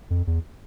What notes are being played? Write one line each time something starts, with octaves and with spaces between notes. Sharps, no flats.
F2
E2